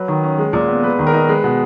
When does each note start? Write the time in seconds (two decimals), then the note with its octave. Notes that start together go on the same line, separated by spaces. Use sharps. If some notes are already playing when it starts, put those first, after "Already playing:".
Already playing: F#3 B4
0.08 D#3
0.23 C#4
0.38 G#3
0.53 A#2
0.68 B3
0.83 G#3 B4
0.99 D#3
1.07 A#4
1.13 D#4
1.29 G#3 B4
1.44 B2